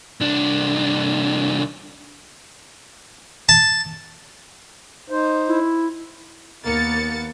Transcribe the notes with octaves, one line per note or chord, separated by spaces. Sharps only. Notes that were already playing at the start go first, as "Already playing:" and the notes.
C2 D4
A5
D#4 C5
E4
D#2 A#3 B3 A6 C#7